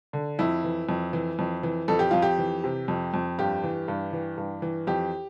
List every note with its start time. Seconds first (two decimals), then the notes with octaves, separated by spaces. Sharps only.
0.13 D3
0.39 F2 E4
0.64 E3
0.89 F2
1.13 E3
1.39 F2
1.63 E3
1.88 F2 A4
1.99 G4
2.11 F2 F4
2.22 G4
2.38 E3
2.64 C3
2.88 F2
3.14 F2
3.39 G2 G4
3.64 E3
3.88 G2
4.13 E3
4.38 G2
4.62 E3
4.87 F2 G4